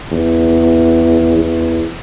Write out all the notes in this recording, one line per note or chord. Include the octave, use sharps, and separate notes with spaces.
E2
E2